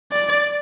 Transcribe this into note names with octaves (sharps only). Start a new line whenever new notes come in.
D5